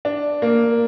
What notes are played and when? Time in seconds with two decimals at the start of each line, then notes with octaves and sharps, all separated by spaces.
0.05 D4
0.42 A#3